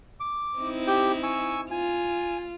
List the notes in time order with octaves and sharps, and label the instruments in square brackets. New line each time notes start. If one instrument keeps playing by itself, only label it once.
[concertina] D6
[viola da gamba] C4 D#4 E4
[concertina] G4 G5
G#5 C#6 E6
[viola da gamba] F4 [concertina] G#5